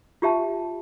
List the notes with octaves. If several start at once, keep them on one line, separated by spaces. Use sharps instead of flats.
F4 G4 E5 A5